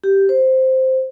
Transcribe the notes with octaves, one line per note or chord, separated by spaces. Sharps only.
G4
C5